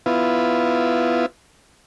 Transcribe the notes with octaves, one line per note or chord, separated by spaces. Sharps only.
B3 E4 F4